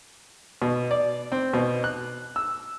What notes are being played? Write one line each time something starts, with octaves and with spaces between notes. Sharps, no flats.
B2
D5
C4
B2
F#6
E6